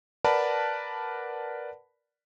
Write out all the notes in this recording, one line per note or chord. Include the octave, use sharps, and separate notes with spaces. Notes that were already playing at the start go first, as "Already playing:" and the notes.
A#4 B4 D5 F#5 A5 B5